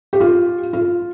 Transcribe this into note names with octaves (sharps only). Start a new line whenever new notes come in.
G4
F4
F4